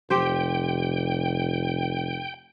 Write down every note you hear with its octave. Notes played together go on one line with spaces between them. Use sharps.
F1 G4 C5 G5